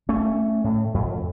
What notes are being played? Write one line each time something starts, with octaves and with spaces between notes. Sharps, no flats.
A3 C#4
A2
F2